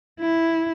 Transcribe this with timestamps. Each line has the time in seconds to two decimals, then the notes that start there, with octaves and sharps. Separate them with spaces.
0.21 E4